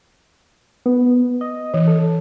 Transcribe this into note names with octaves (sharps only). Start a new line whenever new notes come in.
B3
D#5
E3
A4